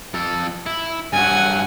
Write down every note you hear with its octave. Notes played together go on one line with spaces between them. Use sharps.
F2 A4
E4
G2 F#3 F#5 G#5